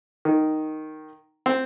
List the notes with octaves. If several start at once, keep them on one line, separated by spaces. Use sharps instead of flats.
D#3
C4